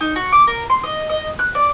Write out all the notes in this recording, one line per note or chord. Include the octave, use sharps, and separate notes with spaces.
D#4
F#4
D6
A#4
C6
D#5
D#5
F#6
D5